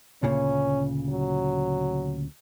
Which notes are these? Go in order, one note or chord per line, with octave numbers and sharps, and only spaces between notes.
D2 A#2 C#3 C#4
F#3